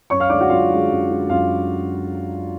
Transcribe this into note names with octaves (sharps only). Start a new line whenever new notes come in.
F#2 C#5 C#6
F5 F6
D3 G#3 D5 D6
F#4 F#5
F#2 F4 F5
D3 G#3
F#2
D3 G#3
F#2 F4 F5